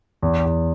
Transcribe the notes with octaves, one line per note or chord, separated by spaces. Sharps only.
E2
E2